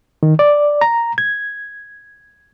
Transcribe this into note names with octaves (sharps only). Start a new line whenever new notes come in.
D#3
D5
A#5
G#6